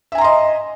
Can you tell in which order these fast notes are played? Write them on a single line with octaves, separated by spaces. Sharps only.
E5 G#5 A#5 C6 D#5